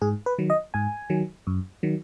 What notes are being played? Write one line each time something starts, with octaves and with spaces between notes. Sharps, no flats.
G#2 G#4
B4
D#3 F#3
D#5
G#2 G#5
D#3 F#3
F#2
D#3 F#3